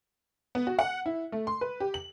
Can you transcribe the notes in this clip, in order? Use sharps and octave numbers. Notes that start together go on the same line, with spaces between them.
B3
F#4
F#5
E4
A3
C6
B4
G4
F#7